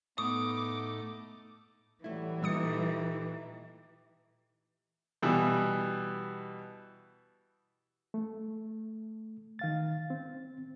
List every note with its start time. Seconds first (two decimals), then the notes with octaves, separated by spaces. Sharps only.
0.18 A2 A3 B3 D#4 D6 D#6
2.04 A2 E3 F#3 G3 A3 E4
2.43 A#2 G3 A3 D#4 G4 D#6 C#7
5.22 B2 E3 G3
8.14 A3
9.59 D#3 F5 A6
10.10 C4